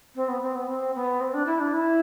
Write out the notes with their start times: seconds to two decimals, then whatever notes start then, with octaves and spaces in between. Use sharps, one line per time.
0.15 C4
0.28 B3
0.42 C4
0.55 B3
0.68 C4
0.95 B3
1.21 C4
1.34 D4
1.46 E4
1.60 D4
1.73 E4